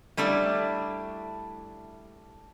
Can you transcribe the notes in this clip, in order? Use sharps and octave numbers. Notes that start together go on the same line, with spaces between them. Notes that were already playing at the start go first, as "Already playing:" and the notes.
G3 A3 D4 E4